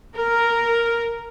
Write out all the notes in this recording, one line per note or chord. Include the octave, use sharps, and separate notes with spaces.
A#4